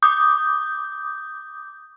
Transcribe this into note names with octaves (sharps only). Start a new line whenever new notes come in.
D6 D#6 G6